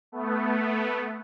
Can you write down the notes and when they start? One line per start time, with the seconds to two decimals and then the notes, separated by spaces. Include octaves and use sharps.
0.12 A3 B3